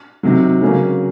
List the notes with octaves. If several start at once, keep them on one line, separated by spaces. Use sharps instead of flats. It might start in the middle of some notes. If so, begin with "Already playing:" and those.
C3 D#3 F#3
C#3 F#3 A#3 C#4